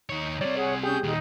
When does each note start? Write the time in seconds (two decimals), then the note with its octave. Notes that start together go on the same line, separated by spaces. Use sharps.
0.09 D#2 D#4 C#5
0.41 G3 C4 C#5 D5
0.56 G#4 C#5 F#5
0.83 C#4 G4 G#4 D#6 G6
1.04 A#2 D#3 D#4